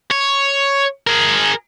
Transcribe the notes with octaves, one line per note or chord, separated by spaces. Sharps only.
C#5
G#4 A#4